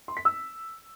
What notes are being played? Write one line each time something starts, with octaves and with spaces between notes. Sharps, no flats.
C6
B6
E6